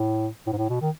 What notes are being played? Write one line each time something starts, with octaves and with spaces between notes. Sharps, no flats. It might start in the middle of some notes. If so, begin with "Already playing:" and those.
Already playing: A2
A2
G#2
A2
B2
D#3